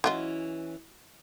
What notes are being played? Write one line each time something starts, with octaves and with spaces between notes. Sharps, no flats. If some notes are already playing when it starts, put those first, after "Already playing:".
E3 F#3 C#4 F4 D#5